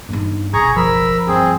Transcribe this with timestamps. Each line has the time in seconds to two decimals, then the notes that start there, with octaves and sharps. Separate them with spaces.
0.09 G2 B3 D#4
0.54 F#1 B1 G#4 A#5 C#6 G#6
0.76 F3 A#4 B5 E6
1.27 G2 C4 G#4